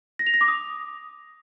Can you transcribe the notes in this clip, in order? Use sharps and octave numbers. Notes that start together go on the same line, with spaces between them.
A#6
F7
A#6
D6
D#6